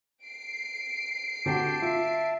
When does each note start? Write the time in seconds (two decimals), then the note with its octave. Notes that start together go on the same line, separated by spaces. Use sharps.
0.24 C7 D7
1.46 D3 C4 F#4 G4 A5
1.82 F4 E5